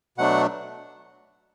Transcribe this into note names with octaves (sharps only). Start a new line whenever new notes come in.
B2 F#3 A3 D4 F#5